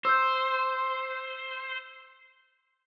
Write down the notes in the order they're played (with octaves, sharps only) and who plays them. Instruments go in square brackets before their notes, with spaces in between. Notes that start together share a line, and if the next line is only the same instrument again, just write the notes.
[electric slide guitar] C5 [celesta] E6 G6